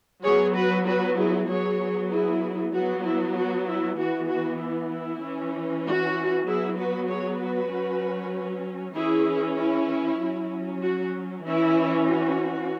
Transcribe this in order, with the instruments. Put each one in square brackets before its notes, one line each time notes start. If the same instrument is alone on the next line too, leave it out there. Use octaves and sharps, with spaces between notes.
[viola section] F#3 B3 G#4 C#5
F#4 B4
F#4 B4
E4 G#4
F#3 B3 G#4 C#5
E4 G#4
F#3 B3 F#4
E4
F#4
E4
E3 B3 F#4
F#4
E4
E4
E3 C#4
F#4
F#3 B3 E4 G#4
F#4 B4
G#4 C#5
F#4 B4
F#3 C#4
E3 C#4 E4 G#4
E4
F#3 C#4
F#4
E3 C#4 E4
F#4